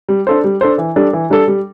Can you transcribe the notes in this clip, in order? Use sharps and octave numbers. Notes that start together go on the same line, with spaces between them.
G3
D4 A4 C5
G3
D4 A4 C5
E3
G3 D4 A4
E3
G3 D4 A4
G3